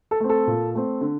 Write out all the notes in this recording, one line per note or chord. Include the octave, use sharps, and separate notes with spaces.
A4
A3 C4
A4
A#2
A3 C4
D3